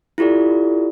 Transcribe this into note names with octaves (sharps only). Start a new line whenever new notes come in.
E4 F4 G4 A4 D5